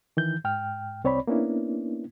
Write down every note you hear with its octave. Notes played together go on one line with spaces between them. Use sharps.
D#3 E3 G6
G#2 G5 F6
C2 C4 C#5 D5 B5
A#3 B3 C#4 D4 E4